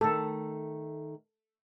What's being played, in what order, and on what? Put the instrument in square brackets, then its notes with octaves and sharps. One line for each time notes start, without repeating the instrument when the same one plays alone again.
[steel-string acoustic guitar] D#3 A3 [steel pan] A4